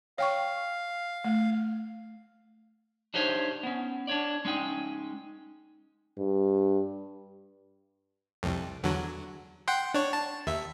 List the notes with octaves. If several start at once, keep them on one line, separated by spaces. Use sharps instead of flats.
C#5 F5 G5 C#6
A3
D4 D#4 G4 C5 C#5 E5
B3 C#4
D4 C#5 D5
G#3 C#4 D#4 G5
G2
C2 F2
E2 D3 F#3
F#5 G5 C6
D4 C#5
A5
D#2 E5